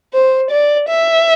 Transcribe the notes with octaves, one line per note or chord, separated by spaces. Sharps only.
C5
D5
E5